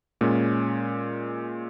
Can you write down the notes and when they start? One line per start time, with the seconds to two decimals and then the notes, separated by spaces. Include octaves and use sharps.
0.21 A#2 G#3 C#4